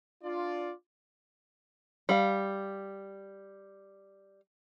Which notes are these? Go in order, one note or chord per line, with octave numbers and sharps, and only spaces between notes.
D4 F4 D5
G3 F5